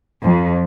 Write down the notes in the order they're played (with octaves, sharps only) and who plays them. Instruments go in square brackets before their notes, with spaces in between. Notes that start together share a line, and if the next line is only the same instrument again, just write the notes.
[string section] F2